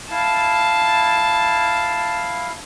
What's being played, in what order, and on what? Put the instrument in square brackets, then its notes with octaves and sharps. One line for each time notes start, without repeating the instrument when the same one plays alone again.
[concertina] E4 F5 [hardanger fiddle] A5